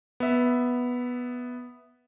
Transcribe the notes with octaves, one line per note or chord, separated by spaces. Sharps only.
B3 E5